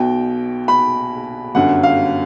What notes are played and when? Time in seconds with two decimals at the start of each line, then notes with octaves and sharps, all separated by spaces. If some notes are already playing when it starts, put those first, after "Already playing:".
Already playing: B1 B2 G5
0.68 B5
1.55 G1 F#2 D3 F#5
1.83 F5